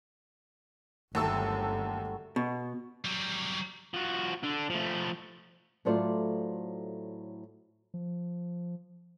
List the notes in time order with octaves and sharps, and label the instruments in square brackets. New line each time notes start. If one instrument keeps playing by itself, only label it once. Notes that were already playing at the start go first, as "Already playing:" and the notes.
[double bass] G1 [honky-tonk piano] D#2 A4 E6 [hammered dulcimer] F#3 G3 A3
[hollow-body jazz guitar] B2
[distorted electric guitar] F#3 G3
F3 F#4
D3 D4
F3 A3
[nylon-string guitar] A2 F#3 A3 F4 C5 D5
[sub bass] F3